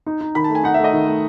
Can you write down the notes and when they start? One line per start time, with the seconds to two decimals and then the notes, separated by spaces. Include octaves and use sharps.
0.07 D#4
0.21 D#4
0.35 D#3 B5
0.44 A5
0.50 A3
0.55 G#5
0.64 D#4 F#5
0.74 E5
0.79 A3 D#5
0.93 D#3
1.08 A3